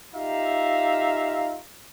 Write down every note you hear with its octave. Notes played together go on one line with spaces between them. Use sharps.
D#4 F4 G4 E5 F5 A#5